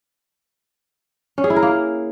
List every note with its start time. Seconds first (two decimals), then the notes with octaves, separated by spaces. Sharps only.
1.38 C#4
1.44 G#4
1.50 E4
1.56 A#4
1.62 A#3